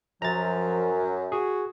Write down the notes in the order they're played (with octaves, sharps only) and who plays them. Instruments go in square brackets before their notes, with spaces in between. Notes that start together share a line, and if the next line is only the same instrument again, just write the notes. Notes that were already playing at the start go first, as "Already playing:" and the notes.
[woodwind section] F#2 [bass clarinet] F3 [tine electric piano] A#5 A6
[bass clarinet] F#4 [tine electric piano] G#4